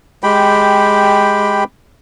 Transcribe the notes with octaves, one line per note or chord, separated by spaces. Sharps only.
G#3 G4 G5 B5